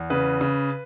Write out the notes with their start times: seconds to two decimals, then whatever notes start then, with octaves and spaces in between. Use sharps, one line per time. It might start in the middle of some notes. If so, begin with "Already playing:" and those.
Already playing: E2
0.10 C#3 B4
0.41 C#3